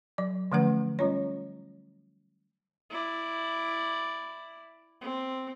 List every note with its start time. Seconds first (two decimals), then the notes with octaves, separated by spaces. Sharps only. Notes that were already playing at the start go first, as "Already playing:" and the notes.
0.18 F#3 D5
0.52 D3 F3 A3 C#4 B4 F#5
0.99 G3 C#4 F4 C#5
2.90 E4 D5
5.01 C4